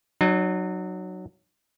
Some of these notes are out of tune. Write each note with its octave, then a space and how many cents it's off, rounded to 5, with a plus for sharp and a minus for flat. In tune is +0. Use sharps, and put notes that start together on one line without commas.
F#3 +0 D#4 -40